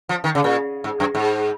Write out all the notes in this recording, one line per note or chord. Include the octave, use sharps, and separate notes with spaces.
F3
D#3
C#3
A#2
G#2
F#2
G#2